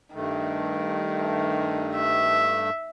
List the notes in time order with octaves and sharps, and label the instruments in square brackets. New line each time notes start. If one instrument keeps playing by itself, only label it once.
[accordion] G2 A3 [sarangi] D#3
[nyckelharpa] E5